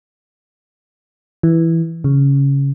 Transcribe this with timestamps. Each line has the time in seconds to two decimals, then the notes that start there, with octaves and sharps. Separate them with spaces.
1.43 E3
2.04 C#3